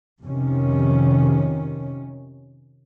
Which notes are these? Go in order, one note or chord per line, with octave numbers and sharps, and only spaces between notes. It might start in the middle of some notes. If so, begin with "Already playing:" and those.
F2 C3 D#3 C#4